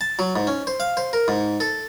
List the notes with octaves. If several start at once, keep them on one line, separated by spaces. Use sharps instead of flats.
A5
F#3
G#2
C#4
C5
F5
C5
A#4
G#2
A4